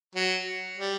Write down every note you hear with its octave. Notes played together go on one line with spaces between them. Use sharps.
F#3
G3